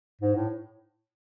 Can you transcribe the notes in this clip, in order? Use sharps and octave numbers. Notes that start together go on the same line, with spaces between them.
G#2
A2